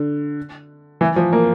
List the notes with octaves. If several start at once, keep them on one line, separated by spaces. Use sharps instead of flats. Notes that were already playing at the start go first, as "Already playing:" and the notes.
Already playing: D3
E3
F3
A#3